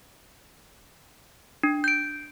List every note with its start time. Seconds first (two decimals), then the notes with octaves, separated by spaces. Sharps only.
1.63 D4
1.84 G6 D7